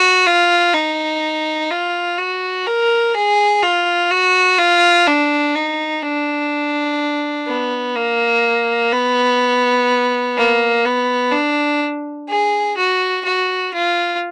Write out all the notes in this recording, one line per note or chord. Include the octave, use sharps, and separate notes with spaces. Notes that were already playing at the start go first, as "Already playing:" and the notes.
Already playing: F#4
F4
D#4
F4
F#4
A#4
G#4
F4
F#4
F4
D4
D#4
D4
B3
A#3
B3
A#3
B3
D4
G#4
F#4
F#4
F4